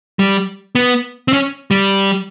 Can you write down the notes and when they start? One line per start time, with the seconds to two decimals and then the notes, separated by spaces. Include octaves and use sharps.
0.19 G3
0.75 B3
1.28 C4
1.33 C#4
1.71 G3